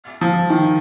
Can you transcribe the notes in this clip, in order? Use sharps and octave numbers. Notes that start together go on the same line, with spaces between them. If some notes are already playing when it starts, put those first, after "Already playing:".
F3
D#3